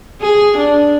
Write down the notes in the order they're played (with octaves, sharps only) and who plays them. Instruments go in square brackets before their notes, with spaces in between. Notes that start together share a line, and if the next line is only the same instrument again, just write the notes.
[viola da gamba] G#4
D4